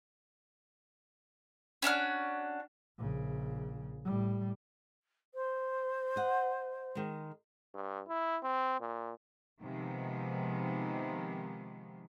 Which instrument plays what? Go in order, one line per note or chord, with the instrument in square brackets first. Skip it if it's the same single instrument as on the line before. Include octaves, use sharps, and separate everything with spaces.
[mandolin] C#4 D4 F#4 F6
[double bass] A#1 C#3
A2 G3
[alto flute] C5
[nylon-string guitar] D#5 F#5
D#3 G#3
[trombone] G2
E4
C4
A#2
[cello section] C3 D#3 F3 G#3 B3